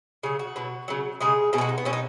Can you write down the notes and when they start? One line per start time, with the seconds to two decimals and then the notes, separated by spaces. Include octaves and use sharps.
0.23 C#3 F#3 G#4
0.39 F#4
0.56 B2 F#3
0.88 C#3 F#3
1.21 C#3 G#3 G#4
1.53 B2 G#4
1.58 G#3 F#4
1.69 D#4
1.78 B3
1.85 B2 F#3 C#4
1.93 D#4